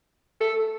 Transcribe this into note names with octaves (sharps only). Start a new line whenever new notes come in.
A4